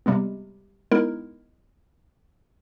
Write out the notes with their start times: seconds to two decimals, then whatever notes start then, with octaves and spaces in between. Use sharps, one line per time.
0.06 C3 G3 G#3 B3
0.91 G#3 B3 D#4 E4 A#4